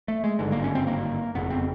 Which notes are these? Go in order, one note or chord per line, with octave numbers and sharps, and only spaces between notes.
A3
G#3
G#1 G2 D3 G#3
A#3
C#4
C4
A#3
F#1 F2 C#3 B3
C4